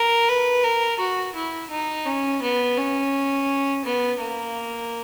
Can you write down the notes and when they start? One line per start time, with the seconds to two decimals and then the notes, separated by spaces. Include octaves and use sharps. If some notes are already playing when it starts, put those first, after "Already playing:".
Already playing: A#4
0.28 B4
0.64 A#4
1.00 F#4
1.36 E4
1.71 D#4
2.06 C#4
2.42 B3
2.77 C#4
3.84 B3
4.20 A#3